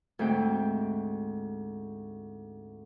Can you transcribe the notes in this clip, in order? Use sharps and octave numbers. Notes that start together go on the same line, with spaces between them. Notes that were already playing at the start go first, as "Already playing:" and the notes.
D2 G#2 C4 G5